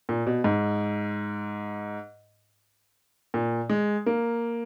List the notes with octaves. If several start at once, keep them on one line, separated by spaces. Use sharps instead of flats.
A#2
B2
G#2
A#2
G#3
A#3